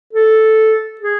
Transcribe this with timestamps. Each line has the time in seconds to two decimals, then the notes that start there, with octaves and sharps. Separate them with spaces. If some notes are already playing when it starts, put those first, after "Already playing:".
0.13 A4
1.01 G#4